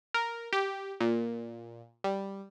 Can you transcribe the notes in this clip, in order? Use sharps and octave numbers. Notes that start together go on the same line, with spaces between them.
A#4
G4
A#2
G3